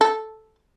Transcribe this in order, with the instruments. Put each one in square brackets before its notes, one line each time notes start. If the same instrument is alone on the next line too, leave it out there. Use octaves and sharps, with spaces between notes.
[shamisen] A4